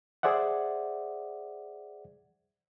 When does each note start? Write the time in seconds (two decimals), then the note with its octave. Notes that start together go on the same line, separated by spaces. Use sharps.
0.23 G#4 C5 D5 E5 F#5